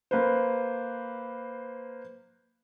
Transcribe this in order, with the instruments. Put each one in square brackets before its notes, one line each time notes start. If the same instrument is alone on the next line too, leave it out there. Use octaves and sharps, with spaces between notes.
[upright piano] A#3 B4 C5